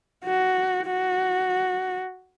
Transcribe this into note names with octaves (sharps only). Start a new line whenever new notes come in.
F#4
F#4